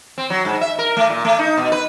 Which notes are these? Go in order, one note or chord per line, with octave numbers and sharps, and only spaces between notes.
C4
F#3
G#2
E5
A#4
A3
A#2
A3
D#4
B2
B4